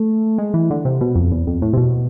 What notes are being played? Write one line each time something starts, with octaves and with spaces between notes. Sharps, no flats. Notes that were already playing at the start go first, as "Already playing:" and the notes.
Already playing: A3
G#3
E3
D3
C3
B2
F2
E2
F2
A2
C3
B2